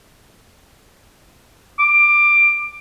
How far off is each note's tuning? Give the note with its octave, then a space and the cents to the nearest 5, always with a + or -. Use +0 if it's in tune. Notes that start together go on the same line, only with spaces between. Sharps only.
D6 +15